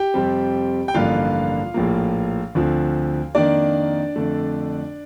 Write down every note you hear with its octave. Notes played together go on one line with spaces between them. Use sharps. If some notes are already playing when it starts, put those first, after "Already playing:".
Already playing: G4 G5
F2 C3 G3 C4
G5
A1 G2 D3 F3 A#3 F4 F5
A#1 A2 F3 A#3
D2 D3 F3 C4
F2 D#3 A#3 D4 D5
F2 D3 A3